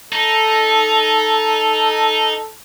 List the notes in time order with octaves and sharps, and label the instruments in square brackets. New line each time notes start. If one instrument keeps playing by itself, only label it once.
[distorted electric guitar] D#4 [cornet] A4